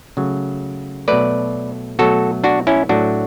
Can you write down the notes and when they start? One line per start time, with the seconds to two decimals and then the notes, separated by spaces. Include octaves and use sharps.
0.17 C#3 F#3 A3
1.08 B2 F#3 A3 B4 D5
1.99 B2 F#3 A3 F#4 A4
2.44 D4 F#4
2.67 C#4 E4
2.89 A2 F#3 A3 D4 F#4